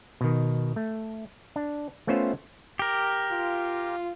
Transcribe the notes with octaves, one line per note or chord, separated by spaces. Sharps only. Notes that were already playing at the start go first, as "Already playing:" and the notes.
B2 D#3
A3
D4
A3 B3 C#4 F4 C5 E5
G4 A#4
F4